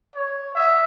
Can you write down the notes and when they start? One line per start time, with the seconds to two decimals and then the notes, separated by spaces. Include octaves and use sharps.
0.15 C#5
0.55 E5